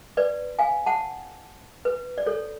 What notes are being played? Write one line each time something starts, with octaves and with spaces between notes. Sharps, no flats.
B4 D5
F5 G#5
F#5 A5
B4
D5
A4 C#5